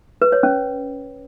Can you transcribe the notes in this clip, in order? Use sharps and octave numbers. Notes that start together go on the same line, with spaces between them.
B4
C#5
C#4